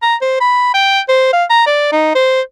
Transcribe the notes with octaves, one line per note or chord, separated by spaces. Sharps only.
A#5
C5
B5
G5
C5
F5
A#5
D5
D#4
C5